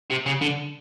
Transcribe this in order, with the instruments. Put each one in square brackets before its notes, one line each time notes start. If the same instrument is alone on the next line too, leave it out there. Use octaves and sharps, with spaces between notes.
[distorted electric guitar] C3
C#3
D3